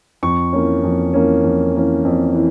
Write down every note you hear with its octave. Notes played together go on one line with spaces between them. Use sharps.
F2 C#6
E3 A#3 C#4
F2
E3 A#3 C#4
F2
E3 A#3 C#4
F2
E3